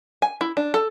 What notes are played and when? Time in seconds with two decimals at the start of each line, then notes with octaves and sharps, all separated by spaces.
0.22 G#5
0.41 E4
0.57 D4
0.74 A4